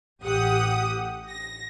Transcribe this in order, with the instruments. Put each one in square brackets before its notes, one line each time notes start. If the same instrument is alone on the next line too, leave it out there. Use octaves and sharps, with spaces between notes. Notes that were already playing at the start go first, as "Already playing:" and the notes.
[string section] A1 G4 F#5 D#6
A#6